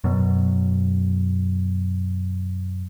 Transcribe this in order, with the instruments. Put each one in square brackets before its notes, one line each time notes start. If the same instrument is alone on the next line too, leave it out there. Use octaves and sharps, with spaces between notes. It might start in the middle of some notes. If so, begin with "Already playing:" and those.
[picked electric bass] F#2 B2